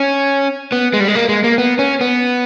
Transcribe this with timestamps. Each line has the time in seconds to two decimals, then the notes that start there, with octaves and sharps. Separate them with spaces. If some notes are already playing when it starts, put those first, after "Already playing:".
Already playing: C#4
0.72 B3
0.93 G#3
1.00 G3
1.08 G#3
1.15 A#3
1.29 G#3
1.44 A#3
1.58 B3
1.79 C#4
2.01 B3